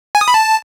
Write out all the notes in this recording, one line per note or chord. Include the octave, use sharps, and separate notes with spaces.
G#5
D#6
B5
A5